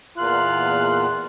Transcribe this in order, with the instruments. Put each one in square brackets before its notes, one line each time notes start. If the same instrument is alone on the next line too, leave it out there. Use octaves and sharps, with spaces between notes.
[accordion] E2 A#2 F#6 [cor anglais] F4